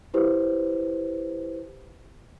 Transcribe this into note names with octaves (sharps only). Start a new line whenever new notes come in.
E4 G4 B4 C5